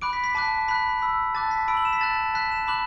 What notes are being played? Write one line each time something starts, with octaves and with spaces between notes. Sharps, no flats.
B5 D6 F#6 D7
B6
B6
A5 D6 F#6 B6
B5 F#6 B6
B5 E6
A5 D6 F#6 A6
B6
B5 E6 D7
F#7
E7
B6
A5 F#6 A6
A5 F#6 B6
E7
B5 D6 F#6 F#7